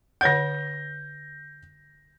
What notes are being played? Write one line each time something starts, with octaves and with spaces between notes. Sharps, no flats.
D3 C#5 F#5 G6 A#6